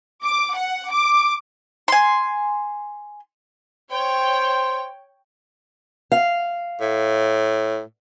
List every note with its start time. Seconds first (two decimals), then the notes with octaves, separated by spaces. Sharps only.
0.24 D6
0.57 F#5
0.92 D6
1.88 G#5 C6
3.92 C5 C#5 G5
6.12 F5
6.81 A2